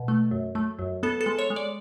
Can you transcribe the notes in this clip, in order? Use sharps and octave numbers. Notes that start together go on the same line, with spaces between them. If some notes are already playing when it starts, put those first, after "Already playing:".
Already playing: B2
A3
F#2
A3
F#2
B3 A4
A4
G#3
C#5
G#3
D5